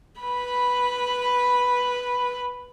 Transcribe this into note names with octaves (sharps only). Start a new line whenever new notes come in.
B4 B5